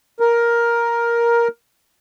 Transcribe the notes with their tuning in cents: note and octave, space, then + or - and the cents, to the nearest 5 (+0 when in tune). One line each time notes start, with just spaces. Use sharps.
A#4 +10